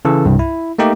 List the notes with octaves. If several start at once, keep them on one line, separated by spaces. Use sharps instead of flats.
C#3 E3 A4
C2 G2
E4
A3 A#3 D#4 G4